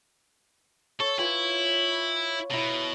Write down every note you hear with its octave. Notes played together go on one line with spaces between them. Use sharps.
A4 C#5
E4 F4 B4 G#5
B2 E4 A#5